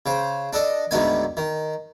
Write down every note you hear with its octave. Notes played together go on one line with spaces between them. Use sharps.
C#3 C5
D4 A4 D#5
D2 G#2 D3 D#3 B3 G#5
D#3